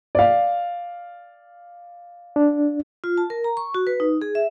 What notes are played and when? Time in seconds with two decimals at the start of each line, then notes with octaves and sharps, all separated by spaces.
0.15 D5 F5
2.36 D4
3.04 F4
3.17 A5
3.30 A#4
3.44 A#5
3.57 C#6
3.74 F#4
3.87 B4
4.00 D#4
4.22 G#4
4.35 E5